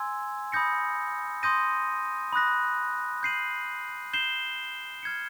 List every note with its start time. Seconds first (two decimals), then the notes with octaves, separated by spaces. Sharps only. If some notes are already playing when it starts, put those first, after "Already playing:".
Already playing: G#5 C6 E6 G#6
0.52 B5 D#6 G6 A#6 C#7
1.43 C6 D#6 G6 A#6 D#7
2.32 B5 D#6 F#6 A#6
3.23 G6 C7 D#7 F#7
4.13 G6 C7 E7 G7
5.03 F6 G#6 C#7